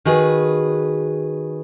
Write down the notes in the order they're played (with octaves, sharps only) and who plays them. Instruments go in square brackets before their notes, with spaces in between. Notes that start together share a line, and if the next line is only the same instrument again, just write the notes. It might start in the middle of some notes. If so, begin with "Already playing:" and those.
[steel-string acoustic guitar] D#3 F#4 G#4 B4